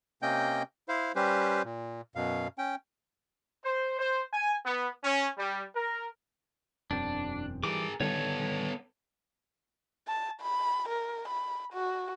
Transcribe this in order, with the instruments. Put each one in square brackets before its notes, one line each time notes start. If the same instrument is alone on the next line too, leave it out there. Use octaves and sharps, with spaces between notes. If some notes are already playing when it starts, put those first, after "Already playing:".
[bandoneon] C3 A#3 C#4 D#5 G5 G6
E4 C5 F5
G3 C#4 G4 B4 C5
A#2
F#2 B2 F5
C#4 G5
[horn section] C5
C5
G#5
B3
C#4
G3
A#4
[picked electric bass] E1 F#2 C4 [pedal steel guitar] D4
[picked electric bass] E3 G3 [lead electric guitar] G#4 A#4 [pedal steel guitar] D6
[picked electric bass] D3 D#3 G3 [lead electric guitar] B3 A4 [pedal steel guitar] C#5
[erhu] A5
B5
A#4
B5
F#4